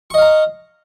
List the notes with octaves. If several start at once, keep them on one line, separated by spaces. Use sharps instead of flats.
D#5 F5 A#5 C#6